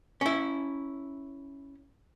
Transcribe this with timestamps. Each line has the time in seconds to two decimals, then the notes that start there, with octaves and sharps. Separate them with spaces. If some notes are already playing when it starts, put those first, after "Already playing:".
0.21 C#4 E4